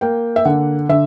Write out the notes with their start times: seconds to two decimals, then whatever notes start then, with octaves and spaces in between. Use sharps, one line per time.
0.01 A#3 G5
0.36 E5
0.45 D3 F#5
0.89 D3 E5